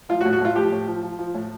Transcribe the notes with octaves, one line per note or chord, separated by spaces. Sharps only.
F3 F4
F#4
A2
F#4
A2 F4
F3 G4
A2
F3
F3
F3
A2